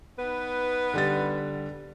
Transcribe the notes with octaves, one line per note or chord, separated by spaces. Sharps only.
B3 D#4 B4
D3 G3 A6